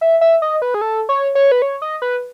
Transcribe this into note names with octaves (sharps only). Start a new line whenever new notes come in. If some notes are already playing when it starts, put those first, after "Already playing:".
E5
E5
D#5
B4
G#4
A4
C#5
C#5
B4
C#5
D#5
B4